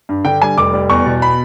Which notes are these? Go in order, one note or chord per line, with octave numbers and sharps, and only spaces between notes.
G2
D3 G5
G3 G#5
F1 D6
G3
E2 C#6
B2
B5